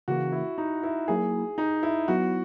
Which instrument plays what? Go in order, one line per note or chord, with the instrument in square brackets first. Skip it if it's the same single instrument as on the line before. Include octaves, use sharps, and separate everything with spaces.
[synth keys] C#3 E3 A#3 [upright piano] F#4
[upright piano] E4
D#4
E4
[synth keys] F#3 A#3 E4 [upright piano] G#4
[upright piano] D#4
E4
[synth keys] F#3 B3 E4 [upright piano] F#4